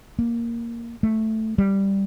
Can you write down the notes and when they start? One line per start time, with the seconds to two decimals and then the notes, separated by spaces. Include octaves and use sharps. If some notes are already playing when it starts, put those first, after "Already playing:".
0.19 A#3
1.03 A3
1.58 G3